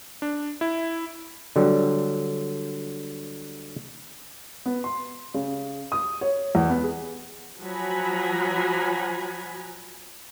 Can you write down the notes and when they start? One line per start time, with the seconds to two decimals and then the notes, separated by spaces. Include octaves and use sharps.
0.22 D4
0.61 E4
1.56 D3 F#3 G3
4.66 B3
4.84 C6
5.34 C#3
5.92 D#6
6.21 C#5
6.55 E2
6.70 B3
6.84 G#4
7.61 F3 F#3 F#5 G#5 A#5 B5